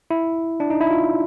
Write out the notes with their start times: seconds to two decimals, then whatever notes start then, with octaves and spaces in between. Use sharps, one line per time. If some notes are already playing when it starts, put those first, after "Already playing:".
0.11 E4
0.60 D4
0.70 D#4
0.81 E4
0.91 F4